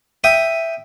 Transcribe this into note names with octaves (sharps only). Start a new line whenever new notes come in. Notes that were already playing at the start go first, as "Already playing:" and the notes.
E5 G5 D#6